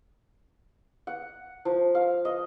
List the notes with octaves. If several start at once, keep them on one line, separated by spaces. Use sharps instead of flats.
F#5
F3
F5
D#5